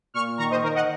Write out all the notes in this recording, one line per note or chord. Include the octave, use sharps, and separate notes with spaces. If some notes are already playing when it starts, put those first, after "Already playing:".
A#2 C#6 F6
D#3 A#5 C#6
C5 D#5
D#3 A#4
D#5 F#5